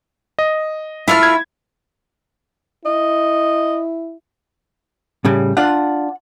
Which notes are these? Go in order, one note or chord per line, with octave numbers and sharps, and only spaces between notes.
D#5
A3 E4 F4 F6
G#6
E4 D#5
A2 C#3 G3
D4 F4 F#5